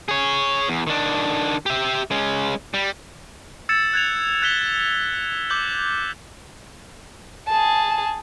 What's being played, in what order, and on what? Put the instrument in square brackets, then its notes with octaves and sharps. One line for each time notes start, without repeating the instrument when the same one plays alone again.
[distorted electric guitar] G#4 C#5
E2
D#3 D4
G4 E5
G#3 C#4
G3
[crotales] E6 G#6 A6 C#7 E7
F#6 G#6 F7
F#6 G#6 B6 G7
D6 G6 F#7
[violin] G#4 A5